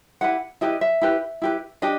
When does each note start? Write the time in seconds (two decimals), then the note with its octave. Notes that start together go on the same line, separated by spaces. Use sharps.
0.21 E4 G4 B4 F#5
0.61 E4 G4 B4 D#5
0.81 E5
1.02 E4 G4 B4
1.42 E4 G4 B4
1.82 D4 G4 D#5